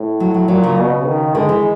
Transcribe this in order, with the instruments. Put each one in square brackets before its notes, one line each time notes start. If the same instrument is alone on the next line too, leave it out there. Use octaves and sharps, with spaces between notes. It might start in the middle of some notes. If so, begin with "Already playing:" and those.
Already playing: [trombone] A2
[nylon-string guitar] F#3
F#3
[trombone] A#2 [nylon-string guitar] F#3
[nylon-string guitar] C#3
[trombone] B2
D#3
[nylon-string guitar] D3 [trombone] G#3
[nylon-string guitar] E3